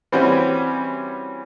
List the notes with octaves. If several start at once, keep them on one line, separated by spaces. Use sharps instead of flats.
E3 G3 C4 C#4 F#4